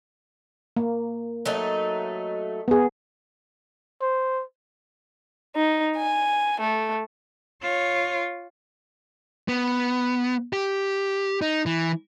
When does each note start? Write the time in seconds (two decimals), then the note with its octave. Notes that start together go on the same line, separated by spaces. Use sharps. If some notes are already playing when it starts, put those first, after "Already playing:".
0.77 A#3
1.45 F#3 A3 D#4
2.68 B3 G#4
4.01 C5
5.56 D#4
5.98 G#5
6.60 A3
7.63 F4 C#5
9.48 B3
10.53 G4
11.42 D#4
11.66 E3